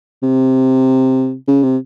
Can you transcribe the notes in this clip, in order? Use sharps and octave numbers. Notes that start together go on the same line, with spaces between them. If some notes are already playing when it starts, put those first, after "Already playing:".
C3
C#3
C3